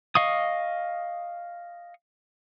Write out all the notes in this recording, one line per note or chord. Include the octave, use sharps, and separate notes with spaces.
D#5 F5 C#6 D#6